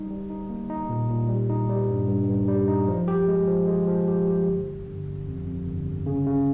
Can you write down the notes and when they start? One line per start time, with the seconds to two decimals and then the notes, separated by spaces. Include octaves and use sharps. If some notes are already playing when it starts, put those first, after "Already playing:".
Already playing: G3 D#4
0.10 G3
0.30 D#4
0.50 A#3
0.70 D#4
0.89 A#2
1.09 A#2
1.29 G3
1.49 D#4
1.70 G3
1.89 G2
2.08 G2
2.29 G2
2.48 G3
2.68 D#4
2.88 F3
3.08 G4
3.28 G#3
3.47 F3
3.67 G#3
3.88 F3
4.08 G4
4.28 G4
4.48 G1
4.68 G1
4.87 G1
5.07 G1
5.28 F2
5.47 F2
5.66 G1
5.87 G1
6.06 C#3
6.27 C#3